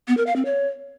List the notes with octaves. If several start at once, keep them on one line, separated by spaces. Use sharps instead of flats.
B3
A#4
F5
C4
C#5